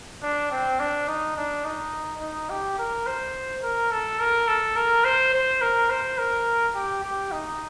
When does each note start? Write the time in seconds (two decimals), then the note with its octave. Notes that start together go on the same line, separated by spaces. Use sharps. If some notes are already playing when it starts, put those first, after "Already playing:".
0.22 D4
0.52 C4
0.80 D4
1.08 D#4
1.37 D4
1.65 D#4
2.21 D#4
2.50 G4
2.79 A#4
3.06 C5
3.63 A#4
3.92 A4
4.20 A#4
4.48 A4
4.76 A#4
5.05 C5
5.34 C5
5.61 A#4
5.90 C5
6.18 A#4
6.75 G4
7.04 G4
7.32 D#4